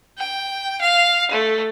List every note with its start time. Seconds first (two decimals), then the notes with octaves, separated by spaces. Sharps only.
0.18 G5
0.81 F5
1.31 A3